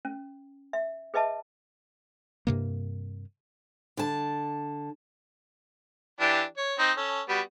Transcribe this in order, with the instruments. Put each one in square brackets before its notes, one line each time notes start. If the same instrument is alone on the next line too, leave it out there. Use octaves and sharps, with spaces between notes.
[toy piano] C#4
E5
G#4 B4 D#5 E5 A5
[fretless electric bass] G2 C3 A#3
[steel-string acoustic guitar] D3 A5
[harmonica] E3 D4 G4
C#5
C4 D#4
C#4 A4
G3 B3 F#4